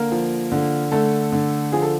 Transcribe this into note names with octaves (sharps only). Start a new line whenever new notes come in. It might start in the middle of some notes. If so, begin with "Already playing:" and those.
Already playing: D3 A#3 A#4
F3
D3
D3 A3 A4
D3
F3 G#4
A4